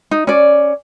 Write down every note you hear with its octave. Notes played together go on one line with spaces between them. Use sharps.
D#4
C#4 D5